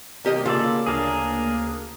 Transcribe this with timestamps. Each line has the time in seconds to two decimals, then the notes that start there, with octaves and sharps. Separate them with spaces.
0.25 C2 A#3 G4 D#5
0.46 C#3 F4 A4 D5
0.86 D2 A#3 D4 G#4 A#4 F5